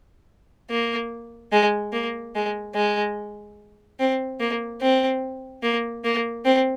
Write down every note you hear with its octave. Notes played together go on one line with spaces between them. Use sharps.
A#3
G#3
A#3
G#3
G#3
C4
A#3
C4
A#3
A#3
C4